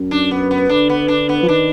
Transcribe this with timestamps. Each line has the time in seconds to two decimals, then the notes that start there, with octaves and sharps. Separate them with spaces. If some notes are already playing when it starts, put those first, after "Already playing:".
Already playing: F#2
0.11 D4
0.31 B3
0.51 B3
0.69 D3 D4
0.89 B3
1.08 D4
1.29 B3
1.43 F3
1.49 D#3 D4